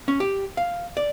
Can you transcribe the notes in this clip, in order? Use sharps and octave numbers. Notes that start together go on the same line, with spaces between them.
C#4
G4
F5
D5